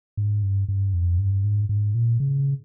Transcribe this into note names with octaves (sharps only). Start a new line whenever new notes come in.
G#2
G2
G2
F2
G2
G#2
G#2
A#2
C#3